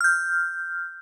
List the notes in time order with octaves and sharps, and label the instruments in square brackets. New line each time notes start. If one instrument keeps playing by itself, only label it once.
[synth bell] F6 G6